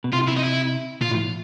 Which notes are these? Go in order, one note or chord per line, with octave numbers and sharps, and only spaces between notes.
B2
C3 F4
E4
D#4
E4
A#2 F4
A2